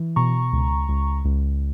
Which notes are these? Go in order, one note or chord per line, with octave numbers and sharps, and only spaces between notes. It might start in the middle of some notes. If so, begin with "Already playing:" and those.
Already playing: E3
B2 A#5 C#6
C#2
C#2
C#2